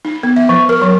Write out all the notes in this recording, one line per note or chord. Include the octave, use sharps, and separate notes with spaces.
D#4
B3
E5
F3
A#4
F#3